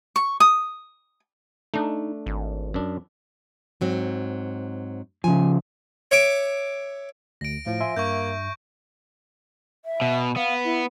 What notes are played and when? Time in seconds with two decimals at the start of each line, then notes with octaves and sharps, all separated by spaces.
0.16 C#6
0.40 D#6
1.74 A3 D4 D#4
2.26 G#1
2.74 F#2 D4
3.81 G#2 F#3 C4
5.24 C#3 F3 G#5
6.11 C#5 E5 D6
7.41 D2 A#6 D7
7.66 A2 F3
7.81 E5 G#5 C6
7.96 G2 A#3 C#6 G6
9.85 E5
10.01 B2
10.36 B3 F5
10.64 E4